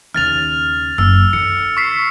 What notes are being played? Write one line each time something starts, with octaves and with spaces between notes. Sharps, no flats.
D#2 C#3 F6 A6 F7
F#1 E6
D3 C#7
C#6 B6 C7